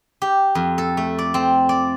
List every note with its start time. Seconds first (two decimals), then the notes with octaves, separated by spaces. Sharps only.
0.22 G4
0.55 F2
0.78 A4
0.97 A3
1.19 D5
1.34 C4
1.69 D5